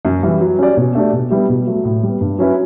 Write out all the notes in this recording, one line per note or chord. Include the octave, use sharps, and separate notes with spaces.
F#2
E3 G3
F#3
C#4 G4 D5
B2
A3 D4 G4 D5
B2
G3 B3 E4 G4
B2
F#3 A3
A2
G3 B3
G2
F#3 C#4 E4 B4